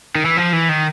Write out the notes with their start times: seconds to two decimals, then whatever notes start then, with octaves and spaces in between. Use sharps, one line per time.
0.15 D#3
0.25 E3
0.37 F3
0.53 E3
0.69 D#3